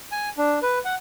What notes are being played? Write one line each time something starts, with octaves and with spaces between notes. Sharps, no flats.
G#5
D4
B4
F#5